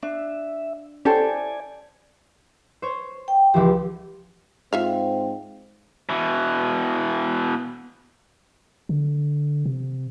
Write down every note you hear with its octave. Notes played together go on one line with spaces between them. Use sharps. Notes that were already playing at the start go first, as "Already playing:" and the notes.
D4 E5
C#4 E4 G4 A4 C5 D5 G#5
C5 C#5
G5
C#2 E3 F3 G4
G#2 C4 F4 E5 F5
B2 E3
D3
C3